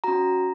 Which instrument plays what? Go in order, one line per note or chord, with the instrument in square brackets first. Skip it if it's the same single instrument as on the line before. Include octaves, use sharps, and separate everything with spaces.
[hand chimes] C#4 F#4 A#5